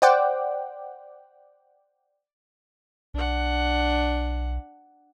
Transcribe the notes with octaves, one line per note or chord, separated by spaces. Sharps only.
C5 D5 F#5 G5 D6
B1 D4 F#5